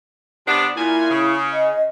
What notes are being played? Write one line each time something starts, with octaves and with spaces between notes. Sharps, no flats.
C3 B3 D4
A#2 E4 G#5
C#3
D#5